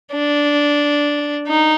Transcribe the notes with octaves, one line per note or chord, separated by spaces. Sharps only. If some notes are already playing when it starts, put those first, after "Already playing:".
D4
D#4